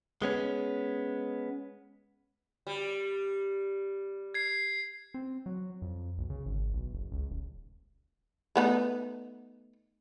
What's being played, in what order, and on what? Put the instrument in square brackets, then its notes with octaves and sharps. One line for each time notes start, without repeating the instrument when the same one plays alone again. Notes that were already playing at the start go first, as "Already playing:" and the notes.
[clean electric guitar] G#3 B3 C#4
[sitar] G3
[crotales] G#6 C7
[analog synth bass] C4
F#3
F2
B1
C#3
G#1
B1
F#1
C#2
D#1
[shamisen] A3 B3 D#4